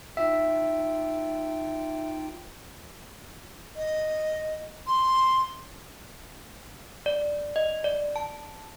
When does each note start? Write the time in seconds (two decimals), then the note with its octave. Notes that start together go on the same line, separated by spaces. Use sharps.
0.17 D#4 F4 E5 G5
3.76 D#5
4.87 C6
7.06 D5
7.56 D#5
7.84 D5
8.16 A5